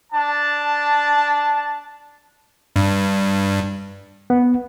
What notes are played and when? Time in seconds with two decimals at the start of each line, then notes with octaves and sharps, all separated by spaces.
0.13 D4 A5
2.76 G2
4.30 B3